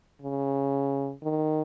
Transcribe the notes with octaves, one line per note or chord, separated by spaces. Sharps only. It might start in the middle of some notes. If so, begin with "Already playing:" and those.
C#3
D#3